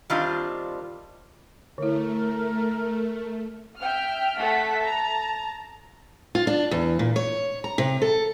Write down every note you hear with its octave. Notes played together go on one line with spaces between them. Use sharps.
D#3 G3 C4 D4 F4
D3 A3 E4 A#4
E5 G5 F6
A3 A4 E5 F#5 A5 B6
A5 A#5
F4
D4
E2
A#2
C#5
A#5
C3
A4